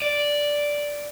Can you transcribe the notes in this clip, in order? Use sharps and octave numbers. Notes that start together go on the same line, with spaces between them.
D5